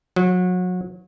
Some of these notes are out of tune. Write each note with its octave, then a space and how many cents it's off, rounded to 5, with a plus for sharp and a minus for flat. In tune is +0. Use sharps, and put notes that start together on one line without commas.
F#3 -30